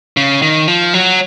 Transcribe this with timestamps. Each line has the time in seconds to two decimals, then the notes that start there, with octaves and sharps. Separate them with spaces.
0.17 C#3
0.42 D#3
0.68 F3
0.94 F#3